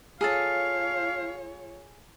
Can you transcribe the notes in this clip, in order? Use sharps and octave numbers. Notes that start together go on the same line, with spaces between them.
F4 G#4 A4 C#5 F5 A5